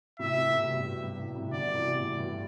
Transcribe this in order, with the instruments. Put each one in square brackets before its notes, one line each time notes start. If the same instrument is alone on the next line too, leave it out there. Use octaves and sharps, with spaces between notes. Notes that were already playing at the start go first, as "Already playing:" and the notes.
[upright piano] A2 C3 [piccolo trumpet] E5
[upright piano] A2 C3
A2 C3
G2 B2
G2
A2
A2 C3
[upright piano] B2 D3 [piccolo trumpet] D5
[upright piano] C3 E3
A2 C3
G2 B2